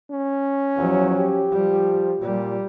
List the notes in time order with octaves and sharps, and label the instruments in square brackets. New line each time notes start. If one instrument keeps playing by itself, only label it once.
[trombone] C#4
[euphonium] E2 [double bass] F3 F#3
[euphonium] G4
[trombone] F3 [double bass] G3
[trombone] A#2 [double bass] G3